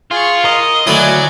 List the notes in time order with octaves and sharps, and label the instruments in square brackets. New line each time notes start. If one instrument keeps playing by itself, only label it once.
[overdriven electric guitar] F4 [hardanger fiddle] G#4 C#6
[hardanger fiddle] A#4 [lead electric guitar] D#5
[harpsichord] D2 E4 [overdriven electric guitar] F#3 [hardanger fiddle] D5 G#5